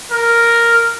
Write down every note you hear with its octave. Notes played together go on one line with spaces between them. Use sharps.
A#4